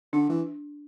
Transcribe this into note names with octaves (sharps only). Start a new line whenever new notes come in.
D3 D4
E3